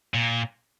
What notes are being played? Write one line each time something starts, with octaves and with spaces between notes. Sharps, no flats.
A#2